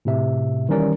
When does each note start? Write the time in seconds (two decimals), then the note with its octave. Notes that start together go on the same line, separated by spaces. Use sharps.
0.05 A2 C3 E5
0.69 D#3 E3 G3 C#4 A#4 D5